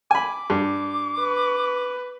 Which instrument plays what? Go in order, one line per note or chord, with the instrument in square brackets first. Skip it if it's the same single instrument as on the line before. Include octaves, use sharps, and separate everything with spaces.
[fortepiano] G#5 B5 [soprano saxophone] D6
[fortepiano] G2
[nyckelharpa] B4